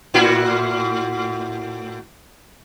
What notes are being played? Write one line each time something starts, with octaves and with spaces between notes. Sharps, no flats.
A2 E4 F#4